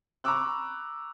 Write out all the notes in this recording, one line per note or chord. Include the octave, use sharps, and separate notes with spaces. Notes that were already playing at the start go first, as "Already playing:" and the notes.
A#5 B5 C#6 D6 E6 F#6